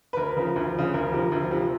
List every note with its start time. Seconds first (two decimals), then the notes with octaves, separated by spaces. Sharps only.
0.13 B4
0.17 D2 A#4
0.36 C#3 F3
0.56 D2
0.74 C#3 F3
0.94 D2 A#4
1.12 C3 F3
1.32 D2
1.51 C3 F3